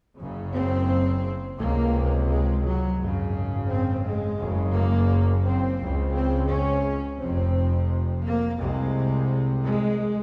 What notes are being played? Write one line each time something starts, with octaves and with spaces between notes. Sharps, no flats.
F#1 F#2 C#3
C4
C#2 C3 A#3
G#3
F#3
G#1 F#2 C#3
C4
G#3
F#1 F#2 C#3
A#3
C4
C#2 C#3
C4
C#4
F1 F2 C3 C4
A#3
C2 C3 G#3
G#3